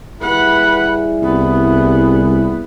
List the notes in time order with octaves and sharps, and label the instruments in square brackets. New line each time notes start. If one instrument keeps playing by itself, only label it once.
[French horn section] G3 E4 G#4 [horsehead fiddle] B4 F#5
[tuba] C2 [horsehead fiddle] B3